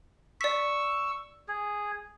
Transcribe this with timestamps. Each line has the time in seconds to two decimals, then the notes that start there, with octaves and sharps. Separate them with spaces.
0.41 D5 C#6 E6 B6
1.48 G#4